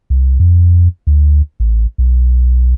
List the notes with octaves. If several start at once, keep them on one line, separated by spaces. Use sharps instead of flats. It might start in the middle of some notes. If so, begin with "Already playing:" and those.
C2
F2
D2
A1
B1